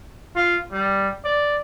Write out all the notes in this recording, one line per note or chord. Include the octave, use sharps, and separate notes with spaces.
F4
G3
D5